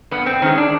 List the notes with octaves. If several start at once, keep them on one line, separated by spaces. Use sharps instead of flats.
G2 B3
C4
D#3 G#3 C#4
D4